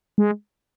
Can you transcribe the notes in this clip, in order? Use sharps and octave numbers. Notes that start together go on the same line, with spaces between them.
G#3